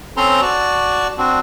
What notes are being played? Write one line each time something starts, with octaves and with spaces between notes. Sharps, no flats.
C4 C#4 A4 C5 A#5 C6
F#4 D5 A5 C#6
C4 D4 F#4